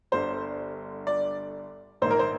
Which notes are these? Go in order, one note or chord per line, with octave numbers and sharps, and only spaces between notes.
G1 G2 D3 C5
D5
A#1 G#2 D#3 C5
A#4
C5